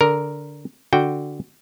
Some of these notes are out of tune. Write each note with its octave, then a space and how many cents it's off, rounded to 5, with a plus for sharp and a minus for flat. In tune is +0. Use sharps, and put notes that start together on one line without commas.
D3 -10 A#4 +0
D3 +0 F#4 +0 G5 +0